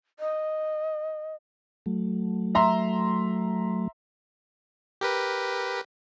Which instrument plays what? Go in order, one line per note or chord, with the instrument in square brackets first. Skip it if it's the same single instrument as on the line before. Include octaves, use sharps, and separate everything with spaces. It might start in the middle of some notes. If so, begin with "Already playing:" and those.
[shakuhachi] D#5
[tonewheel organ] F#3 A3
[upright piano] E5 A#5 C6
[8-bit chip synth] G4 A#4 B4